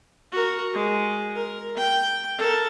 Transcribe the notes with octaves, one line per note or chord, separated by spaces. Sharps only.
F#4 A#4
G#3
A#4
G5
A4 A#4